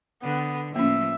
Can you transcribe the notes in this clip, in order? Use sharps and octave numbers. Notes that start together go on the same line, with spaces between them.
D3 B3
A2 F3 A#3 C#4 E5